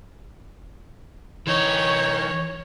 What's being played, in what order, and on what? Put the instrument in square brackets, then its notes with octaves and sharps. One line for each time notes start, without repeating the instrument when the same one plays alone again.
[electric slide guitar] E3 D#4 [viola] C#5